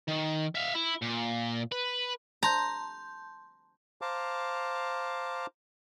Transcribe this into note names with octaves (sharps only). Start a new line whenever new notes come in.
D#3
E5 F5
E4
A#2
B4
A5 A#5 C6 G6
C5 F5 A5 A#5 D6